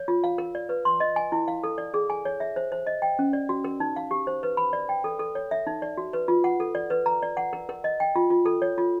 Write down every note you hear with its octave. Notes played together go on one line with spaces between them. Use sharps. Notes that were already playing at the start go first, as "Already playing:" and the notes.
Already playing: C#5
F4
F5
A#4
D5
B4
C6
D#5
G#5
E4
F5
A4
D5
G#4
G#5
C#5
E5
C5
C5
D#5
G5
C#4
D5
F#4
A#4
D#4
F5
G4
C5
B4
B5
D5
G5
A4
A4
C#5
E5
D#4
D5
F#4
B4
F4
F#5
A4
D5
B4
A#5
D5
F#5
A#4
A#4
D#5
G5
F4
F4
A4
C#5
F4